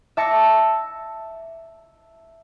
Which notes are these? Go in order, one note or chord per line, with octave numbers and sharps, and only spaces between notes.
E5 A5 D6 A#6 C#7